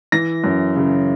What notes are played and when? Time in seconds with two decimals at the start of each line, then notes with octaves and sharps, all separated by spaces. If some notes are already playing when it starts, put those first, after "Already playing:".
0.12 E3 A#6
0.44 F#2
0.76 C#3